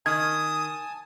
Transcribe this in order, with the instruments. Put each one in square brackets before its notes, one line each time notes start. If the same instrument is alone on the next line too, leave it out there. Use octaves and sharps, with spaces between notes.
[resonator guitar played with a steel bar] D#3 [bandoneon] G#5 A5 [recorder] D#6 [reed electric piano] G#6